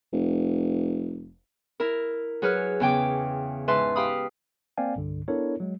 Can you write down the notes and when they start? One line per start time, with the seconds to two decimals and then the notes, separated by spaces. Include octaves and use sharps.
0.13 F1
1.80 E4 A#4
2.42 F#3 G#4 B4 C#5 F6
2.80 E2 C#3 G5 D6
3.68 G#2 B4 E5 A5 C6
3.96 G4 F5 B5 D#6
4.77 A#3 C4 D5 F5 G5 G#5
4.96 C2 G2 D3
5.28 B3 D4 E4 A4 A#4 C#5
5.60 F#3 G#3